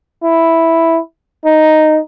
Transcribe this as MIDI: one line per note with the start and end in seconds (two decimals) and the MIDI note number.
0.23 0.99 64
1.45 1.99 63